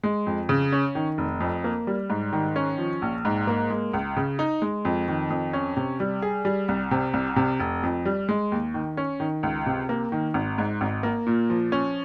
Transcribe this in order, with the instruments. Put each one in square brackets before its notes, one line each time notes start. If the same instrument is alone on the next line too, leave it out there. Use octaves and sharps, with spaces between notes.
[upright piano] G#3
F2
C#3
C#4
D#3
F1
F2
A#3
G3
G#2
D#3
C#4
F3
A#1
G#2
A#3
G#3
C#2
C#3
D#4
G#3
F2
D#3
F2
C#4
C3
G3
G#4
G3
C2
C3
C2
C3
F1
F2
G3
G#3
D#2
D#3
C#4
D#3
C#2
C3
A#3
D#3
G#1
G#2
G#1
A#3
A#2
F3
C#4